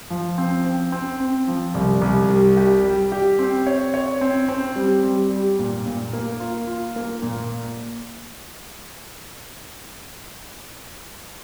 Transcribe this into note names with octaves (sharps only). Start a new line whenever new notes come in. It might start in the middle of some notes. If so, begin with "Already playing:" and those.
F3
C4
C4
C4
C4
F3
C2
C2
G3
G4
G3
G4
C4
C#5
C#5
C4
C4
G3
G3
G3
A#2
A#2
A#3
F4
F4
A#3
A#2